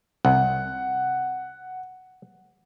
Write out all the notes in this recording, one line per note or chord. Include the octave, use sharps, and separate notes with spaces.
C2 F#5